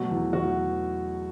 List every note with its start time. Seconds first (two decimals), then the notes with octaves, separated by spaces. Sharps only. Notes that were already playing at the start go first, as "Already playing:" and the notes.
Already playing: B2 F#3 A3 F#4
0.11 E2
0.33 E2 F#4